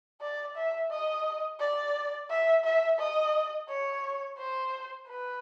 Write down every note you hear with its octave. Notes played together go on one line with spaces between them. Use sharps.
D5
E5
D#5
D5
E5
E5
D#5
C#5
C5
B4